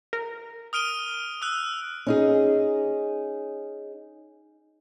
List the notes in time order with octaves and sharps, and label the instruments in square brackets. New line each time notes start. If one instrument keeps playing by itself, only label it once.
[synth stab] A#4
[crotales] D#6 F6 D7 D#7 G7
D#6 E6 F#6
[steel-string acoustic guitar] C#4 D#4 G#4